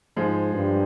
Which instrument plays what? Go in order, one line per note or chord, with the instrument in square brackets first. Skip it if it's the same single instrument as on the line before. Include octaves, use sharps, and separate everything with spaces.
[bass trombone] G#2 [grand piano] F3 G#3
[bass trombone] G2